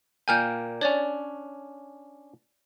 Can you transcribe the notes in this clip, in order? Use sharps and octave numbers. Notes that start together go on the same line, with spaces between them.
A#2 A#3 G5 G#5 F6 G6
C#4 D4 C#5 D5